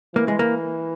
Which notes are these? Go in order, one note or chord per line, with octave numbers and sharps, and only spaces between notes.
E3 A#3
G#3
A#3